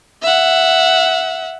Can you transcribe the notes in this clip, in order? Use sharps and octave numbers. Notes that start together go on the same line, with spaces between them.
E5 F#5